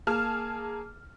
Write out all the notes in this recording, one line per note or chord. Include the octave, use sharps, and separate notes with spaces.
A#3 G#4 A5 F6